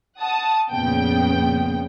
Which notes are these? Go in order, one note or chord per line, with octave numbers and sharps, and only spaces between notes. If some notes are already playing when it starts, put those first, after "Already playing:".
F#5 A5 D#6
F2 A#2 C#3 B3 G5